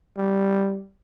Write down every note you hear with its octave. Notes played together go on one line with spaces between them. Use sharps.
G3